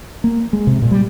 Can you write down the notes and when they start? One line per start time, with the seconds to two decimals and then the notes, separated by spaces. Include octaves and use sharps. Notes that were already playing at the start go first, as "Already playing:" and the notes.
0.24 A#3
0.53 G#3
0.67 C3
0.82 A#2
0.91 G3